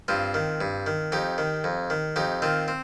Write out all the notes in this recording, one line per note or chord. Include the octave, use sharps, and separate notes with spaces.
G2 C4 F4
D#3
G2
D#3
F2 D#4 G4
D#3
F2
D#3
F2 D#4 G4
D#3 C4 F4
C4